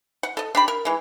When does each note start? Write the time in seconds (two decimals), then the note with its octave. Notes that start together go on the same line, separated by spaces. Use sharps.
0.23 F#5
0.37 A4 D#5
0.55 D4 G4 B5
0.68 A#4
0.85 E3 G#3